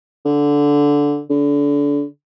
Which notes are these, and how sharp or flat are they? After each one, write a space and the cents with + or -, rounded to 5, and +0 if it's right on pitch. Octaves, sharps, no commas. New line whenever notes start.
D3 -15
D3 -30